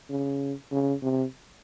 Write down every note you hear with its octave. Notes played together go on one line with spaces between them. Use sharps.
C#3
C#3
C3